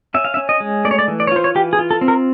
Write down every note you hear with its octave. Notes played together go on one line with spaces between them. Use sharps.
C#4 E5
F5
E5
C#4
D#5
G#3
A3 D5
C#5
D5
E3
D5
C#5
F4 C5
C#5
E3 G4
G#4
F4
A4
C4
A#4